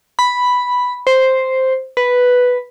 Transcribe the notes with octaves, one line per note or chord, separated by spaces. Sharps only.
B5
C5
B4